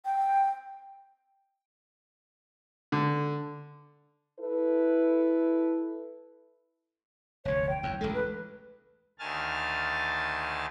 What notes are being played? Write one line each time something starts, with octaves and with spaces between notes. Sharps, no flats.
G5
D3
E4 A4 B4
F1 D2 C#5
G5
F#1 E2
A1 D2 G#3 A4
B4
D2 D#3 G#5 A5 F6 A6